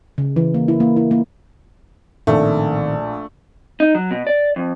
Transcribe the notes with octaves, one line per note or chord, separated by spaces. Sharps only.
C#3
E3
A#3
E4
A#3
E4
A#3
A#1 A2 D#3 A3 C4
D#4
F#3
B2
D5
F2